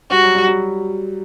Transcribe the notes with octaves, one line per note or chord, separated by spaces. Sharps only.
G3 F#4
F#3
G3
F#3